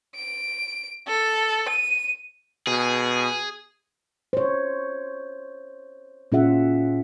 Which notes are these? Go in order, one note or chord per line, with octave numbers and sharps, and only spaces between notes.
D7
A4
D#7
B2 G#4
C5 C#5
A#2 C#4 F4 G#4 E5 F#5